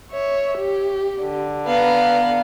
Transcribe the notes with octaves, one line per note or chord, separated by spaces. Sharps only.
C#5 E5
G4
D3
B3 B4 F5 A#5